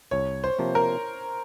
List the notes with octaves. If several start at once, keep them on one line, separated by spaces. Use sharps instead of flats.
C2 C#5
C5
C3 F3 A#3
A#4